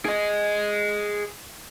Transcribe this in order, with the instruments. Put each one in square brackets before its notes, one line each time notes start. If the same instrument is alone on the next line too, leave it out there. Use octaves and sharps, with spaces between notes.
[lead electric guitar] G#4 D#5